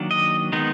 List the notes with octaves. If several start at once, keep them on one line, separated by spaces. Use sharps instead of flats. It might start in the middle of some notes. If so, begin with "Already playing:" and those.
Already playing: D#3 F#3 A#3 D4
D#5
D#3 G#3 B3 D#4